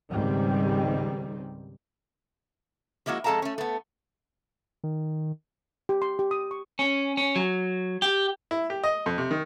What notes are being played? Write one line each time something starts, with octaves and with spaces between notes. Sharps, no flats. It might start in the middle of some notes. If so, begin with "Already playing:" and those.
C#2 G#2 D#3 G3 C4
F3 G#3 A#3 E4 F#4
F2 G#3 A4 F5 A5 A#5
A3 C#4
A3 B3
D#3
G4
C6
G4
D#6
C#6
C#4
C#4
F#3
G4
E4
G4
D#5
F2
C3
D#3